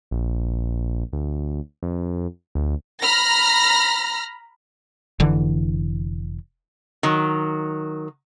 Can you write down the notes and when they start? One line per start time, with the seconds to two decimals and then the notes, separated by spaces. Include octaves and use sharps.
0.11 A#1
1.13 D2
1.83 F2
2.55 D2
3.01 A#5 B5 F6 A#6
5.20 F1 D3 E3
7.03 D#3 F#3